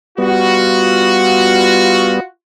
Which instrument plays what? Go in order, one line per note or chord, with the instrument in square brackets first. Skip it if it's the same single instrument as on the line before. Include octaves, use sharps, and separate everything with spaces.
[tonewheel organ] G3 B3 [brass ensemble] F4 F#4